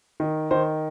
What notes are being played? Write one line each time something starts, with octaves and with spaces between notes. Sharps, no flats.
D#3
D#3 C5